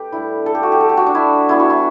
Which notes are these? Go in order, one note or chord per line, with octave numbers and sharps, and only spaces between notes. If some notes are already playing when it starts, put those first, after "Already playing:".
Already playing: A3 G4 B4
A2 G3 D4 E4
A4
G4
F#4
G4
A4
G4
F#4
D4
E4
E3 G3 B3 D4 E4
F#4
E4